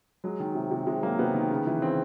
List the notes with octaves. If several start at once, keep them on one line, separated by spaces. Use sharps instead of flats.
F#3 G#3
D#3
C3
C3
C3 G#3
F#3 A#3
C3 B3
D#3
C#3
E3
C#3 C4